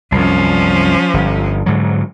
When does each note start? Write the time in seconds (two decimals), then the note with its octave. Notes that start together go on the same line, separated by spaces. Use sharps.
0.12 C2 F#2 F3 C#4
1.14 G1
1.66 G#2 D3 F#3